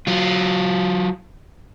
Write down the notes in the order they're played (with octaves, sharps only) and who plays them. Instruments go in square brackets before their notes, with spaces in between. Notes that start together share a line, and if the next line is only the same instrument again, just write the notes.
[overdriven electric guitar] F#3 F4